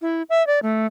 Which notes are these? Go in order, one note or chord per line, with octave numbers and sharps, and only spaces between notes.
E4
E5
D5
A3